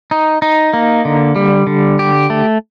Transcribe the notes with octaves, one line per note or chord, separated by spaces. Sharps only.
D#4
D#4
A#3
D3
G3
D3
G4
A3